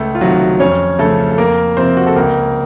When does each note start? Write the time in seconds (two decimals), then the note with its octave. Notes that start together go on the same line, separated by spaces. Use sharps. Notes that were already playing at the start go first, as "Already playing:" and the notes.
Already playing: C#2 A3
0.15 F4
0.21 C3 D#3 F#3 F#4
0.60 F2 C#4 C#5
0.99 C#3 F3 A3 A4
1.31 A4
1.38 F2 A#3 A#4
1.77 C3 F3 C4 C5
1.97 F#4
2.07 A4
2.16 C#2 A#3 A#4